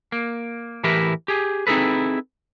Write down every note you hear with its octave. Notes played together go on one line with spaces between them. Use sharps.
A#3
A2 E3 E4 G4 A#4 B4
G4 G#4
C4 D#4 E4 G#4 A4 B4